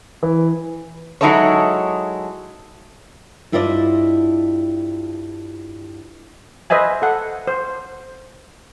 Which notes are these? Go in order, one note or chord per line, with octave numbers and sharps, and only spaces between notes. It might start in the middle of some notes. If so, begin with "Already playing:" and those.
E3
F#3 G#3 D#4 E4 A4 C#5
G2 E4 F4 C5 D5 D#5
B4 C5 D#5 E5 G#5
A4 F#5
C5